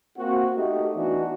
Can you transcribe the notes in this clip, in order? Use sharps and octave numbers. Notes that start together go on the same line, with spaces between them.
A#3 C4 F#4
A3 D#4 F#4 G4
E3 B3 D4 D#4 F#4